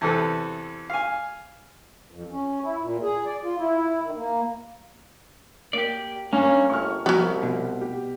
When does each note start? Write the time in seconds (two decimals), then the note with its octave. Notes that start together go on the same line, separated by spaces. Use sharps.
0.01 E2 C3 A4 B4
0.90 F5 G#5
2.11 F2
2.31 C#4
2.64 E4
2.81 A#2
3.02 G#4
3.26 D5
3.44 F4
3.58 E4
4.03 D#3
4.16 A#3
5.73 A#3 G4 D5
6.33 G2 A#3 C#4
6.70 G1 C#6 F6
7.06 C2 F3 F#3 B3 F6
7.43 B2
7.81 G4